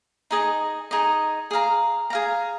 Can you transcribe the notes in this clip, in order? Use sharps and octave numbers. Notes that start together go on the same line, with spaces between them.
D#4 G#4 D#5
D#4 G#4 D#5
G#4 F5 A#5
G#4 F5 A#5